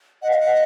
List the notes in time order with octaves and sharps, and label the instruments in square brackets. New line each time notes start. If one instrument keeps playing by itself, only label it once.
[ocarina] D#5 [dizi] F#5
[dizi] F5
F#5